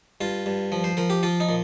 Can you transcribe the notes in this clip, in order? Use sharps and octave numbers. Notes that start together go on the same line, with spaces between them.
G2 F4
G2
F3
C5
F3 A#4
G4
F3 F4
D#4
A#2